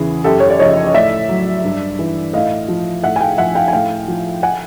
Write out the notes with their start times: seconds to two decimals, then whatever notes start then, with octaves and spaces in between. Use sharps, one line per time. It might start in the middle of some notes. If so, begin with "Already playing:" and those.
Already playing: E2 C#3 E3 G#4
0.24 F#2 G4 A4
0.40 C#5
0.50 D5
0.60 C#3 F3 C#5 D#5
0.87 D#5
0.94 A2 D5 E5
1.29 F#3
1.64 G2
1.99 E3
2.33 A2 D#5 F5
2.68 F3
3.03 A2 E5 F#5
3.16 G#5
3.21 F5 G5
3.38 F3 E5 F#5
3.55 F5 G5
3.68 G#5
3.73 A2 F5 G5
4.08 F3
4.43 F#5 G#5